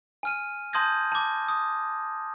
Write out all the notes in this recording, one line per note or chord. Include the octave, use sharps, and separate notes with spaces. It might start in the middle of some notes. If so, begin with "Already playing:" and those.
G#5 F6 D#7
A5 C6 D#6 G6 G#6 A#6
A5 D6
D#6